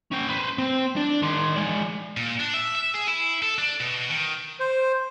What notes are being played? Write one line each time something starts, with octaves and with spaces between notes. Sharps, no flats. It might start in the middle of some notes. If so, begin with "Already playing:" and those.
C#4 G5
B4 C5
C4
D4
D#3 C6
G#3 D5
A#2
D4
E5
E5
G#4
E4
A4
D4
B2
D#3
C5